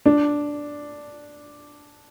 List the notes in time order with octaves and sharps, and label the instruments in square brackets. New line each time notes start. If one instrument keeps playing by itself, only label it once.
[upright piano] D4